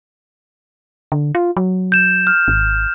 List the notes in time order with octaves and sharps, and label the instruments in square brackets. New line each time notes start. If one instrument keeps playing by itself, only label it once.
[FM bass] D3
F4
F#3
[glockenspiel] G6 E7
F6
[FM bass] G#1